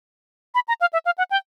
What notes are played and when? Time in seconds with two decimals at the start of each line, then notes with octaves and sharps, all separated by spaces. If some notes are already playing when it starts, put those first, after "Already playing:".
0.55 B5
0.68 A#5
0.81 F5
0.93 E5
1.06 F5
1.18 F#5
1.31 G5